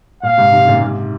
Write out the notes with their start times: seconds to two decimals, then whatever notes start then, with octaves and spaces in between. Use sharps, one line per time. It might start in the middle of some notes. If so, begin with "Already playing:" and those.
0.23 A#2 F5
0.37 G#2 C3
0.53 C3 D#3
0.67 A#2 C#3
0.81 G#2 C3